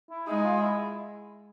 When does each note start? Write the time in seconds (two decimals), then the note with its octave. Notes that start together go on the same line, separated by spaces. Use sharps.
0.11 E4
0.27 G#3 D#4
0.44 F4
0.61 E4